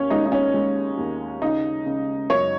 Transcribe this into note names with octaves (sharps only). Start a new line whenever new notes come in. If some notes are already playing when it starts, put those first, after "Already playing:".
Already playing: D#2 C#4 C#5
G#3 D#4
D#4
C#4
G#3
D#2
C#3 D#4
C#3
F#2 C#5